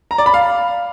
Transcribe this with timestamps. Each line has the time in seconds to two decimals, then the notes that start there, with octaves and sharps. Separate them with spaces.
0.11 A#5
0.18 D5
0.26 B5
0.34 F5